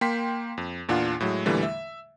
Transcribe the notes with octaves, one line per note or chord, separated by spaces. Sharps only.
A#3 G5 C6 B6
F2
E2 A#2 D4 F4 F#5
A2 F#3 G#3
E2 A#2 D3 E3 G3 A3
E5